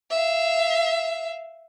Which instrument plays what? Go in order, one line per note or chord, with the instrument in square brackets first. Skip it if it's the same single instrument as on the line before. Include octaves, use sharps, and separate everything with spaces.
[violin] E5 F5